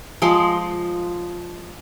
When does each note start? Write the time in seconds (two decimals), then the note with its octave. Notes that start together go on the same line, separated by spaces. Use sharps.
0.22 F3 G#3 C6 D6